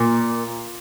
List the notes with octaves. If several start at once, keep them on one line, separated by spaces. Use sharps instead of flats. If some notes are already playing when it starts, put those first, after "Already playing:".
Already playing: A#2